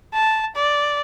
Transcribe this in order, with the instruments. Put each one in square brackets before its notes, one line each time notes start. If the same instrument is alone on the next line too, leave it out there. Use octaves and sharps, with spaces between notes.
[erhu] A5
D5